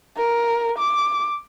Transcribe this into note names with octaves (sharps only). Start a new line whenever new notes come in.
A#4
D6